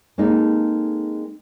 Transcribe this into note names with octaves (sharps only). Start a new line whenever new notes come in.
G#3 A#3 C4 D#4 A4